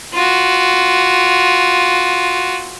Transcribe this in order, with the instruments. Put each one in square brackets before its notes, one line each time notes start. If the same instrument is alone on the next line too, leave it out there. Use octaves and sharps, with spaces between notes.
[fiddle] F4 F#4